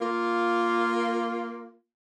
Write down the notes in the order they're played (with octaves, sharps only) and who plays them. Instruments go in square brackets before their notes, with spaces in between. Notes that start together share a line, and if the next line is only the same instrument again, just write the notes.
[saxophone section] A#3 F4